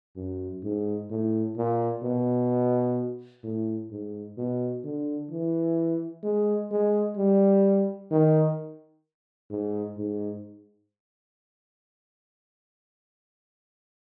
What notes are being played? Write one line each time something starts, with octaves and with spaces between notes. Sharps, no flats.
F#2
G#2
A2
A#2
B2
A2
G#2
B2
D3
E3
G#3
G#3
G3
D#3
G#2
G#2